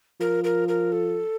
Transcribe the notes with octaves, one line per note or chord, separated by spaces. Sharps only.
F3 A#4
A#4
A#4
A4